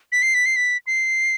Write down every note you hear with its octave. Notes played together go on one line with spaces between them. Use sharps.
B6
C7
B6
C7
B6
C7